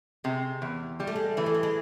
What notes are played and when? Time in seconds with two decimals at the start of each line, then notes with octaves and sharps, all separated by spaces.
0.24 C3 G#3
0.62 E2
1.00 G3 G#3
1.07 A3
1.16 G#3
1.37 E3 A3
1.46 G#3
1.54 G3
1.63 G#3